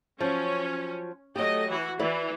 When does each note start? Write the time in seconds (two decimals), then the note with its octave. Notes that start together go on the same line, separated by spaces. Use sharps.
0.20 F3 F#3 C#4
1.36 F#3 A3 G4 D#5
1.69 E3 F#4
1.99 E3 E4 B4 D5